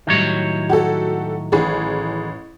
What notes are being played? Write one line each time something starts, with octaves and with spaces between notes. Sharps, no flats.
A2 D#3 F#3 G3 E4 C#5
F#4 G4 A4
A1 G#4